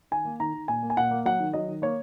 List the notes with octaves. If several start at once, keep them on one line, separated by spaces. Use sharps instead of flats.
D#3 G#5
A#3
D#3 A#5
D#3
A#2 G#5
A#3
G#5
A#2 F#5
A#3
F#3 F#5
D#3
F#3 D#5
D#3
A#3 C#5